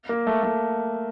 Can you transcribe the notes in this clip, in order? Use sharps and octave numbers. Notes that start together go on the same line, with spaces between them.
A#3
A3
A3